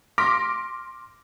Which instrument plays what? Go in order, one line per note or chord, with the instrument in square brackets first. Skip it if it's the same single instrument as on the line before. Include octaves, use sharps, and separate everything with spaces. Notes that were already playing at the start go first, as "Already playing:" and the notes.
[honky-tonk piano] C6 D6 F6 A#6 B6 D7